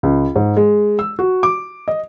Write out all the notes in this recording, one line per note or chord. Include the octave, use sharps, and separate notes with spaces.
C#2
G#2
G#3
E6
F#4
D6
D#5